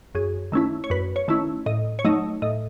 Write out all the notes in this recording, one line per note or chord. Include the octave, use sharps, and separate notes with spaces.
F#2 G#4
D#3 A3 C#4 E4
C#5
F#2 B4
C#5
D#3 A3 C#4 E4
A2 D#5
C#5
F#3 A3 D#4 D#5
A2 D#5